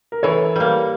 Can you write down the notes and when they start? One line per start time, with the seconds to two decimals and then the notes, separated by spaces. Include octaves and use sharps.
0.12 A#4
0.23 E3 A4 C#5
0.56 G3 A#3